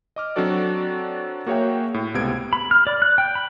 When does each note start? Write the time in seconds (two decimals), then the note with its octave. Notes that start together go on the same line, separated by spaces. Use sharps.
0.16 D#5 D6 F6
0.36 F#3 C4 D4 F#4 A4 D5
1.46 A#3 F#4 G#4 C#5 E5 G5
1.94 A2
2.14 C#2 C3 B3 G#6 D7
2.53 B5
2.71 F6
2.87 D5
3.02 F#6
3.18 G5
3.35 B5